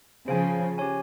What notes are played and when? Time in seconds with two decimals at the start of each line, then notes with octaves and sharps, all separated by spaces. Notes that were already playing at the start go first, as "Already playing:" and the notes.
0.27 C#3 F3 G#4 C5 F5 G#5
0.78 C#4 G4 C#5 G#5